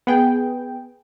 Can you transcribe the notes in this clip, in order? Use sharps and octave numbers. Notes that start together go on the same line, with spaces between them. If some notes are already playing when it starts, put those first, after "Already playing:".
B3 G#4 G5